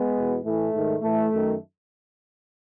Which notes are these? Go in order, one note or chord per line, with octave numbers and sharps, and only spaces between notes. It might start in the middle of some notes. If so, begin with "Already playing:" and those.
Already playing: G#3 B3
E2 B2
A2 E3 A3
G#2 D#3
A2 E3 A3
F#2 D#3